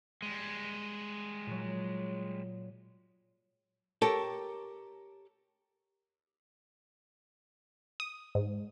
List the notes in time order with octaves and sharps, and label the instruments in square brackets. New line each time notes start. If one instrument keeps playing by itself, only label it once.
[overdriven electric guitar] G3 G#3
[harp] A#2 F#3
[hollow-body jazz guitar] G4 A4 A#4 C#5 G5 A5
[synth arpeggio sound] D#6
G#2